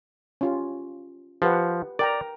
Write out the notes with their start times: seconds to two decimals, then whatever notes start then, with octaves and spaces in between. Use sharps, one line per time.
0.41 C#4 F4 G4
1.42 F3 G4 B4 F#5
1.99 A#4 D5 G5 A#5